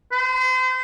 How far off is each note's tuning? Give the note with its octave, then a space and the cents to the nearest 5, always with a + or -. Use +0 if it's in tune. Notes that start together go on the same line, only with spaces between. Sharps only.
C5 -35